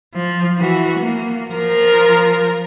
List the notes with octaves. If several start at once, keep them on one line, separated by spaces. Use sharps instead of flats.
F3
E3 F#4
A#3
F3 A#4